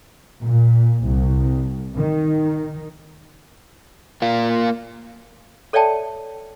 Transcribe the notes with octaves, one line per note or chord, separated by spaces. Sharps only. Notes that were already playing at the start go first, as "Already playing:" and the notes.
A#2
C2
D#3
A#3 F4
A4 C#5 D5 E5 G5 A5